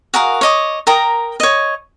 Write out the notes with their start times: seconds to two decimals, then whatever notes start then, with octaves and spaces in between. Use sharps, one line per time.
0.14 F#4 G#4 A#4 F5
0.41 C#5 D#5 D6
0.87 A#4 G5 A#5 D#6
1.40 C#5 D#5